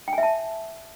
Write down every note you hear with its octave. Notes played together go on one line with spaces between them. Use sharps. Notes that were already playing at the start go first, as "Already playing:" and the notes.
G5
G#5
E5
A5